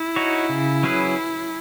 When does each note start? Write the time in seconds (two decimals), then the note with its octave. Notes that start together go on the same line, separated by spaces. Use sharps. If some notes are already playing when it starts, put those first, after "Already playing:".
Already playing: E4
0.16 D#4 F#4 C#5
0.49 C#3
0.83 F#3 C#4 G#4 B4